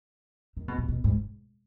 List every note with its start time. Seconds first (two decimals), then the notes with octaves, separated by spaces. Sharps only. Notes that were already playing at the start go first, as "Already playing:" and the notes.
0.57 D#3
0.68 B2
0.78 B2
0.88 B2
1.04 G#2